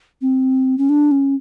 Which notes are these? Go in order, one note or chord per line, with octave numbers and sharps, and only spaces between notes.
C4
C#4
D4
C#4